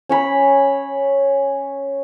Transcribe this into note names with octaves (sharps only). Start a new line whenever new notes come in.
C#4 C#5 B5